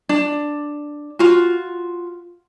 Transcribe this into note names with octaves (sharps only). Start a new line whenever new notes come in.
D4
F4 F#4